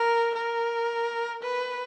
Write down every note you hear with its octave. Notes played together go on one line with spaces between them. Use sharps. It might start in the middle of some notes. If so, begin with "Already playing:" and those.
Already playing: A#4
A#4
B4